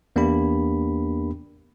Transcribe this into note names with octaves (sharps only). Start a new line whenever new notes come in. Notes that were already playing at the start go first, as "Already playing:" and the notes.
E2 A#3 B3 D4 G4 B5